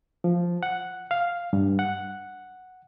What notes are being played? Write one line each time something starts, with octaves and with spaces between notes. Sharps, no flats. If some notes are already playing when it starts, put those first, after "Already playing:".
F3
F#5
F5
G2
F#5